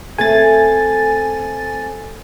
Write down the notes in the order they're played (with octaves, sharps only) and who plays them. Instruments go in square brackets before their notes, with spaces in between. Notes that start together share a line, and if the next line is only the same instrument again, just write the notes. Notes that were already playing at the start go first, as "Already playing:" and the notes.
[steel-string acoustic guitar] A3 C4 A4 [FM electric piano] G#5 A6